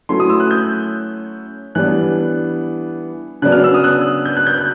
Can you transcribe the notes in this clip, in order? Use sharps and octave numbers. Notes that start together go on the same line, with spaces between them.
F#3 A3 C#4 E4 C6
D#6
E6
F#6
G6
E3 G3 B3 D4 F#6
C#3 F#3 B3 D4 F#6
F6
E6
D#6
F#6
G6
F#6
G6
F#6